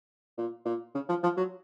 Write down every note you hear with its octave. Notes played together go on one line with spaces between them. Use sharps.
A#2
A#2
C#3
F3
F3
F#3